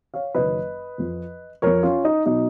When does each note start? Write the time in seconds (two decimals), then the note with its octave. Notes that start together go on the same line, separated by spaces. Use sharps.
0.14 C#5 F5
0.34 F#1 F#2 D#3 F#3 B4 D#5
0.98 F2 F3
1.62 F2 F3 A#4 C#5
1.83 C#4 F4
2.05 D#4
2.26 B2 F#3 D#4